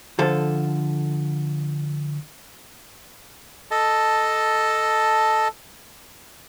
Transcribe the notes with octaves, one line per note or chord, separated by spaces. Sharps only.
D3 F3 A4
A4 D#5 A5